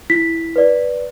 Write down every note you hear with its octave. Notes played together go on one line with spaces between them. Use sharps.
E4 B6
B4 D5